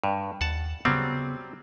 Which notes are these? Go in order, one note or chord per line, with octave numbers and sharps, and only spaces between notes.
G2
D#2 F#5 A5
C#3 F#3 G3 B3 C4